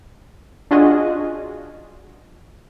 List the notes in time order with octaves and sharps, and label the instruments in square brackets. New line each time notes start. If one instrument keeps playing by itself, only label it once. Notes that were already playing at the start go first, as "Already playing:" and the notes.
[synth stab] D4 F4 F#4 G#4 D#5